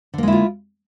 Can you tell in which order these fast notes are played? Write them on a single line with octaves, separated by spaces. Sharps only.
D3 A#3 G#3 E4 F4